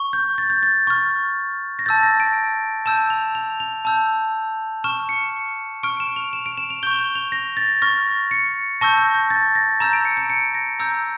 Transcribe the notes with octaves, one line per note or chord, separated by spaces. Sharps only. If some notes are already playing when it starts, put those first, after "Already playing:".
Already playing: C#6
G6
A6
G6
A6
C#6 F6
A#6
A5 E6 G6 A6
A#6
D7
A5 E6 G6 E7
F7
F7
F7
A5 E6 G6
C#6 F6 E7
C#7
C#6 F6 D7
E7
F7
E7
D7
E7
F7
C#6 G6 G7
G7
F7
A#6
A6
C#6 F6 A#6
C#7
A5 C#6 E6 G6 A#6
G6
G6
A6
A#6
A#5 E6 G6 E7
D7
C#7
D7
C#7
A#6
A#5 E6 G6